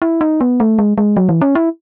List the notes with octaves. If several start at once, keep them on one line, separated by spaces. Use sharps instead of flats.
E4
D#4
B3
A3
G#3
G#3
F#3
E3
C#4
E4